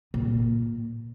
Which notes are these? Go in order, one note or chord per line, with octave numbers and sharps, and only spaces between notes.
A#2